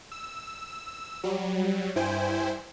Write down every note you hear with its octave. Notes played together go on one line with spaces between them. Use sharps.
E6
F#3 G3
G2 E4 C5 G5 G#5